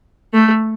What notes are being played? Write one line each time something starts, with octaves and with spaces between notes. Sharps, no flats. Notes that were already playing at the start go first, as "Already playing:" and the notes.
A3